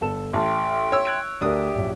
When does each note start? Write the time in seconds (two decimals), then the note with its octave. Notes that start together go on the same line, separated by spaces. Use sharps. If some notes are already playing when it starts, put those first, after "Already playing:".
0.01 G1 A4 E7
0.33 A1 E5 G5 A5 C6
0.92 C#5 E6
1.05 F#6 G#6 D7
1.41 D2 A3 D4 G4 A#4 E5 D#6
1.75 A#1 F#2